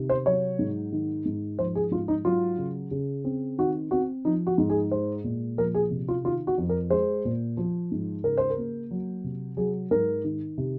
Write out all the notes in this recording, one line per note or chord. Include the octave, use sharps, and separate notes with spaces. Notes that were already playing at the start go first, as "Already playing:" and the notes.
Already playing: C3 D#3
C5
F#3 C#5
G#2
D#3
G#2
F3 C5
G#4
G#2 F4
D#4
F#3 F4
C#3
C#3
C4
D#3 F#4
C4 F#4
F3 D#4
F#4
G#2
G#4
G#3 C5
A#2
F3 A#4
G#4
C3
F4
D#3 F4
F#4
F2
A#4
G#3 C5
A#2
F3
G#2
C#3 A#4
C5
A#4
A#3
F#3
C3
F#3 G#4
G#2 A#4
D#3
C3